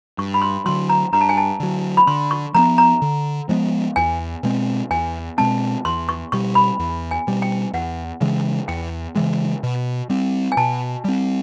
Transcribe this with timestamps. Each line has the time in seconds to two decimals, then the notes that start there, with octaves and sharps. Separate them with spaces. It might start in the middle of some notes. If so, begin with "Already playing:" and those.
0.18 G2 C#6
0.34 B5
0.42 C6
0.66 D3 F#3 C6
0.89 A#5
1.13 G2 A#5
1.21 A5
1.29 G#5
1.37 A5
1.60 D3 F#3
1.97 B5
2.07 D3 C6
2.31 C#6
2.55 F3 G#3 B3 A#5
2.78 A#5
3.02 D3
3.49 F3 G#3 B3
3.96 E2 G#5
4.43 B2 G#3 C4
4.90 E2 G#5
5.38 B2 G#3 C4 A5
5.85 E2 C6
6.09 C#6
6.32 B2 G3 C#6
6.55 B5
6.79 E2
7.11 G#5
7.27 B2 G3
7.42 G5
7.73 E2 F#5
8.21 C#3 E3 G#3
8.68 E2 G5
9.16 C#3 E3 G#3
9.63 B2
10.09 G3 C4
10.52 G#5
10.57 B2 A5
11.05 G3 C4